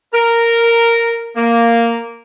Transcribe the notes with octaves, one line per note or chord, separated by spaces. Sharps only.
A#4
A#3